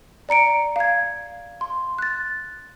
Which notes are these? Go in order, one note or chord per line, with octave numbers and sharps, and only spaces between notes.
D5 A#5 C#7 D7
F5 G#6
C6
F#6 A6